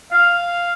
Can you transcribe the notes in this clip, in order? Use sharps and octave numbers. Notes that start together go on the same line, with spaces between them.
F5